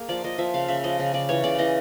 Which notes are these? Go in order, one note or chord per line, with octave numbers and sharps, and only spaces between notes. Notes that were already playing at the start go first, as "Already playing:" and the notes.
Already playing: A#3 G#4
F3 D5
F3 D#5
F3 E5
C#3 F5
C#3 E5
F3 D#5
C#3
C#3 D5
E3 C#5
C#3 D5
E3 D#5